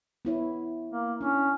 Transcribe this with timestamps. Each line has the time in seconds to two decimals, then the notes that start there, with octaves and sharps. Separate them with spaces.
0.25 B3 E4 C#5
0.92 A#3
1.21 C#4 D4 E4